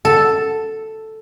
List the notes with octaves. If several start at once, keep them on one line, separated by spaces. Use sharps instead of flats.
A4